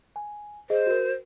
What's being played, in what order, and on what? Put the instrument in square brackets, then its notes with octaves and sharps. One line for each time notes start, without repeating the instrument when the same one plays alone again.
[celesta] G#5
[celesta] G#4 D#5 [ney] C5
[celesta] F#4 A#4